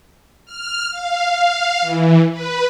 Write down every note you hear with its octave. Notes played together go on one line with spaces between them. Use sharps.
F6
F5
F5
E3
B4